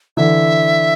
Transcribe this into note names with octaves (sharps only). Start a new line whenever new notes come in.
D3 E3 E5